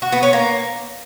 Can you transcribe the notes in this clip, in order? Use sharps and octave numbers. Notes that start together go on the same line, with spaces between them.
F#4
B3
C#4
A#3